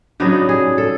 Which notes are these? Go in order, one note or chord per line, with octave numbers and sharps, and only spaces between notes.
C#3 F#3 B3 D4 D#4
G#4
A4